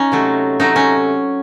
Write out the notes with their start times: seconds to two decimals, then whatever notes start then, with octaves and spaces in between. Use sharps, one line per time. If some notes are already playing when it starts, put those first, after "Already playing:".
Already playing: C#4 D#4
0.12 C3 F#3 A3
0.59 C3 F#3 A3 D#4
0.76 C#4